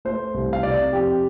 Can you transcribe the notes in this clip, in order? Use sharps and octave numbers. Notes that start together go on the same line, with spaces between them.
A3 C5
C2
F5
C3 D5
F2 G4